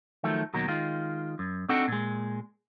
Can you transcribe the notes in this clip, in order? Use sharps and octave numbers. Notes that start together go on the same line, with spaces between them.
D#3 F3 F#3 A3
D#2 B2 F#3 A#4
D#3 G#3 F4
F#2
C4 D4 D#4 F#4 A4 F#5
A#2 G#3